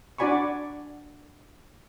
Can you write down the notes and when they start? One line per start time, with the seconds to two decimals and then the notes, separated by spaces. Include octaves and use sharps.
0.18 D4 F#4 D5 G#5 B5 C#6